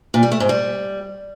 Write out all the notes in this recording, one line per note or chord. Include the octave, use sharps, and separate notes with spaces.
A#2
G3
A3
G#2
G3